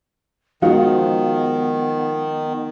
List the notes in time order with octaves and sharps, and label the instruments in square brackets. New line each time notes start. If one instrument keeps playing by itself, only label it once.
[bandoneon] D#3 [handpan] F3 G#3 F4 [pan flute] B3 [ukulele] D#4 F#4 F5